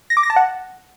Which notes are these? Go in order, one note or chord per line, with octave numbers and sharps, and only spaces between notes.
A#6
D6
A#6
A5
F#5